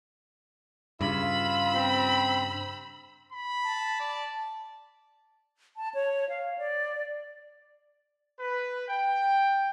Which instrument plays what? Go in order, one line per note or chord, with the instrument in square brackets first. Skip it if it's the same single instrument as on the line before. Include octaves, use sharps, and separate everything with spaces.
[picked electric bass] G2 C#3 [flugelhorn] F4 [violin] B5 E6
[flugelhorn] C4
[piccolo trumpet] B5
[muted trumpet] A5
[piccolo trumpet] D5
[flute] A5
C#5
F5
D5
[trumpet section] B4
G5